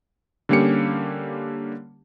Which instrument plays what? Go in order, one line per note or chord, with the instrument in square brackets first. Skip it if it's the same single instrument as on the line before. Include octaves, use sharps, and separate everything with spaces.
[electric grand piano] D3 G3 A#3 C#4 G4 C#7